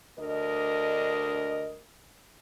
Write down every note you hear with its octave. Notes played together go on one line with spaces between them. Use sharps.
D2 D4 A#4 D#5